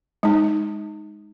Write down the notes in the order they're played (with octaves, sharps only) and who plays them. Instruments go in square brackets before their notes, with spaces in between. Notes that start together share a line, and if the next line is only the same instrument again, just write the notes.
[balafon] G#3 D#4